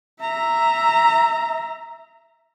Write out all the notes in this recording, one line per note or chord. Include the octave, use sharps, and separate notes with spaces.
E5 A#5